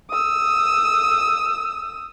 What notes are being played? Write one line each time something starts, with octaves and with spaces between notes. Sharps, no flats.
D#6 E6